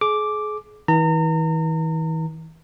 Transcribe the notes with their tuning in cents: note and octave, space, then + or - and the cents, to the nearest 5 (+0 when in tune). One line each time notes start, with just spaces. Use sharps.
G#4 +35 D6 +0
E3 -45 A#5 -35